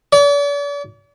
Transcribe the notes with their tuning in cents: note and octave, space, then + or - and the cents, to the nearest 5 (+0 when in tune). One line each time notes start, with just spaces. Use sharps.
D5 -45